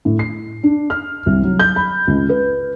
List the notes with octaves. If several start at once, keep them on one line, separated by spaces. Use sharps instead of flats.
A2
C7
D4
F6
C2
F#3
G6
B5
C#2
B4